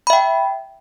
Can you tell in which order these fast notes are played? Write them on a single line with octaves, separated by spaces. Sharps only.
B5 E5 G5